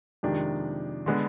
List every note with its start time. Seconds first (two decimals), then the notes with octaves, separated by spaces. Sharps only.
0.23 F2 C3 D#3 G#3 D4
1.06 D3 G#3 B3 D4